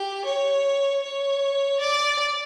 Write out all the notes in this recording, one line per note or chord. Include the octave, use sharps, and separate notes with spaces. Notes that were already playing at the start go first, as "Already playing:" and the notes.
Already playing: G4
C#5
C#5
D5